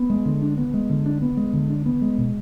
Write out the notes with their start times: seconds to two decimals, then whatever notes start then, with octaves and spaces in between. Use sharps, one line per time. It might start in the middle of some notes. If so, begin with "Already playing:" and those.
Already playing: B3
0.10 G#3
0.26 D3
0.42 D4
0.57 B3
0.74 G#3
0.90 D3
1.06 D4
1.22 B3
1.37 G#3
1.53 D3
1.70 D4
1.86 B3
2.02 G#3
2.18 B2